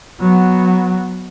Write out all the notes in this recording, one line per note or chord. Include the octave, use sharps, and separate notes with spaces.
F#3 B3